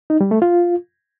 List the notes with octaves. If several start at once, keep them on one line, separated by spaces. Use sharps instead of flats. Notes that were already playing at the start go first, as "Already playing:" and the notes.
D#4
G3
A3
F4